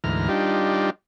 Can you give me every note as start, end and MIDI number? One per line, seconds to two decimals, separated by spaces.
0.04 0.29 38
0.04 0.29 44
0.04 0.29 52
0.04 0.29 82
0.04 0.29 89
0.29 0.90 55
0.29 0.90 62
0.29 0.90 63
0.29 0.90 65
0.29 0.90 67